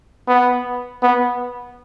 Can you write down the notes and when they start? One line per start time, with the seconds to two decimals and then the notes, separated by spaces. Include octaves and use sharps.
0.28 B3
1.03 B3